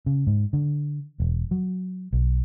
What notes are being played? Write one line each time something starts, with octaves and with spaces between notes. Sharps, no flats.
C#3
G#2
D3
E1
F#3
B1